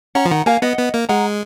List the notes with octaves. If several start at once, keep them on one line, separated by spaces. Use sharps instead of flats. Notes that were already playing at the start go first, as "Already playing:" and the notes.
C#4 F#5 A#5
F3
D#3 F#5 A#5
A#3 F5 G#5
B3 D#5 F#5
B3
A#3
G#3 F#5 A#5